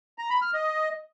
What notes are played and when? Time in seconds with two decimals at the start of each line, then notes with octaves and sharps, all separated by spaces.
0.18 A#5
0.30 B5
0.42 F6
0.54 D#5